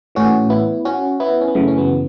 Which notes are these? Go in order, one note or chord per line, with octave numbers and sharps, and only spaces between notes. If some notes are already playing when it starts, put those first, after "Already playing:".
A2 E3 C#4 F#4
B3 E4
C#4 F#4
B3 E4
C#4
B3
F#2 C#3 E3 A3
C#4
F#3 B3